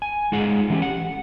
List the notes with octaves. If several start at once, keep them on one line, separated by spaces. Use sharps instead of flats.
G#5
G#3 D#4 F4 G#4 F#5
E3 A3 C#4 E4 G4
F#5